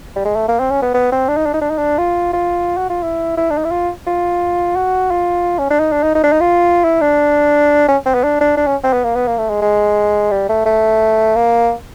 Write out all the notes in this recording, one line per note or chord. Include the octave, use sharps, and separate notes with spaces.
G3
G#3
A3
A#3
C4
C#4
B3
B3
C4
D4
D#4
D4
D#4
D4
D#4
D4
F4
F4
F#4
F4
E4
E4
D4
D#4
E4
F4
F4
F#4
F4
C#4
D4
D#4
D4
D#4
D#4
D4
D#4
F4
E4
D4
C#4
C4
B3
D4
D4
D4
C#4
C4
B3
A#3
B3
A#3
A3
G#3
G#3
G3
A3
A3
A#3